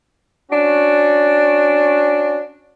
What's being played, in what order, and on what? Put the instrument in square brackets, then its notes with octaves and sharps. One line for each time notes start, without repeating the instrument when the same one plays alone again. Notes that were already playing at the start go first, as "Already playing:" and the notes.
[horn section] C#4 D4 F#4